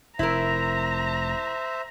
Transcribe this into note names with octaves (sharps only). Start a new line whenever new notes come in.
F1 E4 A#4 C5 E5 A#5